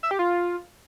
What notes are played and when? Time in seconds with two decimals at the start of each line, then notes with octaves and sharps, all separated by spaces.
0.03 E5
0.11 G4
0.19 F4